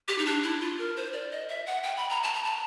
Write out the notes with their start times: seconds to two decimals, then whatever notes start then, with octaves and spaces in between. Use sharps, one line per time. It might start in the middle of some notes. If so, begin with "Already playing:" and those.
0.08 G4
0.18 D#4
0.26 D4
0.43 E4
0.61 F4
0.79 A#4
0.97 C5
1.13 D5
1.31 D#5
1.49 E5
1.66 F#5
1.83 G5
1.97 B5
2.10 A#5
2.23 A5
2.34 A#5
2.44 A5